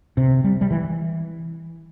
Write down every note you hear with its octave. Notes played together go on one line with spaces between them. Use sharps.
C3
G3
G3
E3